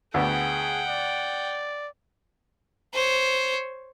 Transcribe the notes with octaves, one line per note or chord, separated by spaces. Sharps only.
D2 D3 B3 G#4 F#5 G5
D5
C5 C#5